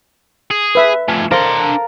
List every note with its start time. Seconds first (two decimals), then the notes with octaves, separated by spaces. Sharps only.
0.51 G#4
0.75 B4 E5
1.08 F3 A3 G#5
1.31 D4 A4 A#4 C5 F5 C6